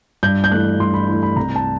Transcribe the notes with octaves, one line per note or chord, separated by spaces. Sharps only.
G2 G6
G6
E3 A3 F#6
G2 C6
B5
E3 A3 C6
B5
C2 A#5
A5